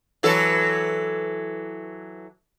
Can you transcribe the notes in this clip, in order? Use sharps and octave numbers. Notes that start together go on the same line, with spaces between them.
E3 F#3 A4